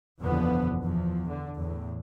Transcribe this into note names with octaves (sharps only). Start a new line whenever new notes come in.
F#1 E2 B2 D3 F3 B3
E2 F3
D3
E2 A2